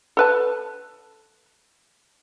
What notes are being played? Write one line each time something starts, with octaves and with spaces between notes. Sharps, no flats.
A4 B4 A5